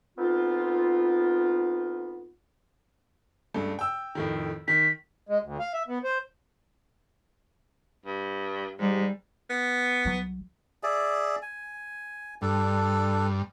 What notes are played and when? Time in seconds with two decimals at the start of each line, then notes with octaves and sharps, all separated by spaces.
0.17 D2 B3 C4 D#4 F4
3.54 C#2 G2 A3
3.79 G5 E6
4.15 F2 A2 D#3
4.68 D#3 B6
5.29 G#3
5.44 D2
5.59 F5
5.74 E5
5.88 B3
6.04 C5
8.06 G2
8.79 G#2 G3
9.50 B3
10.05 C2 F#3
10.83 G#4 D5 E5
11.42 G#5
12.42 G2 D4 A4